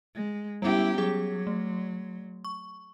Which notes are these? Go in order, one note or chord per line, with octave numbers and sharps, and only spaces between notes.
G#3
G3 B3 C#4 E4 G4
F#3 G#4 D6 G#6
A3
C#6